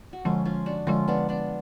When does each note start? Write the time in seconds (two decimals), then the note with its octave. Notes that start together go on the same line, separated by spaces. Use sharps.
0.13 F#4
0.25 D3 F3 G#3 C#4 F4
0.45 C#4 F4
0.66 D4 F#4
0.87 D3 F3 G#3 C#4 F4
1.08 B3 D4
1.29 B3 D4